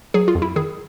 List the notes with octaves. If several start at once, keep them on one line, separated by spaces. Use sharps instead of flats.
F#3 G#4
F4
F2
E4
D#3 G#4